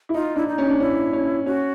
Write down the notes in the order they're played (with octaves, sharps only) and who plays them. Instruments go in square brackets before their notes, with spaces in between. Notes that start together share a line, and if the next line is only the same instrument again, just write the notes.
[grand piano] E4
[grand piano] D#4 [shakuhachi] F4
[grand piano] D4 [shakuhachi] E4
[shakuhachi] D#4
[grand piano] C#4
D4
[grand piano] C#4 [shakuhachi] E4
[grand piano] C#4
[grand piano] C#4 [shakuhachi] F#4